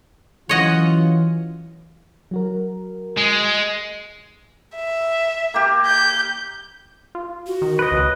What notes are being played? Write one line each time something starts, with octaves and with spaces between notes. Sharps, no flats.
E3 F#3 C#4 F4 C#5 D#5 F#5
F#3 F#4 A#4
G#3
E5
A#3 G4
G6
F4
F#4
D#3
B4 D#5
C#2